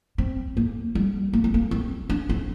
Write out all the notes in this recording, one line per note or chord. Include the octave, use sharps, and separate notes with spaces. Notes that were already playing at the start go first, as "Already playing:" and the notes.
C4
A#3
G3
A#3
C4
A#3
C4
D4
C4